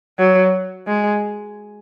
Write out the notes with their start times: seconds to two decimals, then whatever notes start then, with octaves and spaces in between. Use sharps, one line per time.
0.19 F#3
0.87 G#3